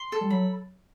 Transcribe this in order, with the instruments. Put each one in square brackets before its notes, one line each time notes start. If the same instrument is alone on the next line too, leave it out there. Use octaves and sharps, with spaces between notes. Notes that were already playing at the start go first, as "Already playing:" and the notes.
Already playing: [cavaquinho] C6
A4
[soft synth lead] G3
[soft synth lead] F#3 [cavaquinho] B5